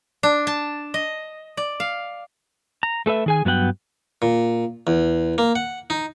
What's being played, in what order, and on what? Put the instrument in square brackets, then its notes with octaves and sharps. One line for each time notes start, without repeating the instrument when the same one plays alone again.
[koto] D4
A5
D#5
D5
F5
[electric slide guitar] A#5
A3 A4 B4 E5
D#3 G#4 G#5
G2 F#3 B3 F#5 G5
[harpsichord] A#2
E2
A#3
F#5
D#4